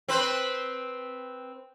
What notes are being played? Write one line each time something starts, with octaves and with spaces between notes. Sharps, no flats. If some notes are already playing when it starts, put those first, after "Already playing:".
C4 B4 C5